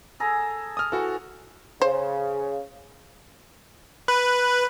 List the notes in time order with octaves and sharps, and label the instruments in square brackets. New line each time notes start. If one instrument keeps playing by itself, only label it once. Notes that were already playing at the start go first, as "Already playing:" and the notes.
[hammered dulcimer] G#4 A4 A#5
[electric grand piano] D#6 F6
[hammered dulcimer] E3 [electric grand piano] F#4 A4
[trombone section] C#3 [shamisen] C5
[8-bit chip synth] B4